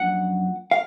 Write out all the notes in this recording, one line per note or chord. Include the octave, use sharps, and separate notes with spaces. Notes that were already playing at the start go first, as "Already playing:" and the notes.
Already playing: F#2 F3 A#3 D4 F#5
F5